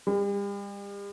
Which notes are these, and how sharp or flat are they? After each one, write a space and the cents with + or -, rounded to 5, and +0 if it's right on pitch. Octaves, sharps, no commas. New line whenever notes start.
G3 +40